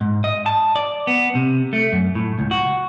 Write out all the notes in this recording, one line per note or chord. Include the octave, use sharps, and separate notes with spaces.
G#2
D#5
A5
D5
B3
C3
A3
F#2
A2
C#2
F#4